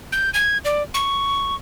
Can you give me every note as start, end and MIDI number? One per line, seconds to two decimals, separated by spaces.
0.12 0.30 91
0.34 0.58 92
0.65 0.83 74
0.94 1.55 85